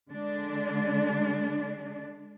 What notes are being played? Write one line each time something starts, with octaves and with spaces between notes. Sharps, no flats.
D3 G#3 D4